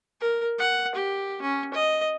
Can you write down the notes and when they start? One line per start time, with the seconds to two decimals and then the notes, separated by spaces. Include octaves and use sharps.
0.21 A#4
0.59 F#5
0.95 G4
1.42 C#4
1.74 D#5